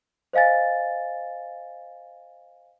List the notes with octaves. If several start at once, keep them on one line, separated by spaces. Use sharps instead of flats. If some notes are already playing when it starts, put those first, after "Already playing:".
C5 D#5 F5 G#5 A6